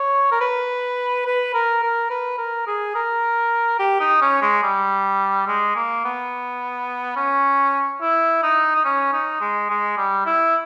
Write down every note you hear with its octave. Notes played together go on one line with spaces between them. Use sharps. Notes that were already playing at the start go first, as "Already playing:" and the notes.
Already playing: C#5
A#4
B4
B4
A#4
A#4
B4
A#4
G#4
A#4
G4
D#4
C#4
G#3
G3
G#3
A#3
B3
C#4
E4
D#4
D#4
C#4
D#4
G#3
G#3
G3
E4